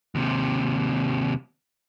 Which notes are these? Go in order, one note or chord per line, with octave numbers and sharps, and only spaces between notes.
D#2 C3